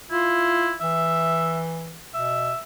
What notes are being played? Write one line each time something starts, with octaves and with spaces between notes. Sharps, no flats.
E4 F4
E3 E5
B2 E5